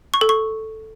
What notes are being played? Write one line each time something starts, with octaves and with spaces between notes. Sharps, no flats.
C#6
A4
C#6